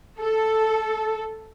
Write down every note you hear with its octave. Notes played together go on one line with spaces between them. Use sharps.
A4